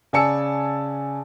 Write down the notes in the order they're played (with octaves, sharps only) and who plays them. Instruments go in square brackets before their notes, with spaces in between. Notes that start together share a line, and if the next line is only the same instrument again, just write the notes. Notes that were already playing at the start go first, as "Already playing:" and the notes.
[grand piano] C#3 D5 G#5 A5 E6 C#7